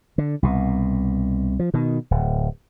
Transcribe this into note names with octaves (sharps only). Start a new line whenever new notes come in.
D3
C2 B2
F3
B2 D#3
D1